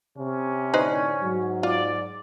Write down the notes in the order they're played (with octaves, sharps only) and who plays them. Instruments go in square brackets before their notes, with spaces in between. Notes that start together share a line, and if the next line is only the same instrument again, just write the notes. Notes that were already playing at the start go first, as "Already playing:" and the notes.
[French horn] C3 [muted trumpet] C#4
[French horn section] A2 D3 D5 [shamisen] D#4 B4 C5
[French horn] G#2 [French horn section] F#3
[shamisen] F4 [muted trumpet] D5